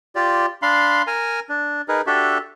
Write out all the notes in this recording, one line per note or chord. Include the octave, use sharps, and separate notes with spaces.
F4 G4 D5
D4 F5 B5 C6
A#4 G#5 A#5
D4
D#4 G#4 A#4 B4
D4 F#4 G4 A4 E5